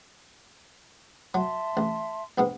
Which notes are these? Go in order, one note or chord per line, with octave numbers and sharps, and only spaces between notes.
F#3 E5 A5 C6
A1
A#1 G#2 B3 G5